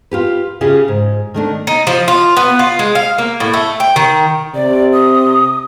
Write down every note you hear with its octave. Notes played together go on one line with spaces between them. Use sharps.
F4 G4 B4
C#3 F4 G4 G#4
G#2
D#3 A3 D4
D#4
F3
F4
B3
F4
G#3
F5
A#3
A2
A3
G5
D#3
C3 D5
D#6